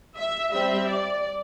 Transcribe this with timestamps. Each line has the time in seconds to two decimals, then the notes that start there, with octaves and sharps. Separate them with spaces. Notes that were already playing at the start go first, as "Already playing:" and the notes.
0.16 E5
0.51 G3 C4 E5
0.87 D5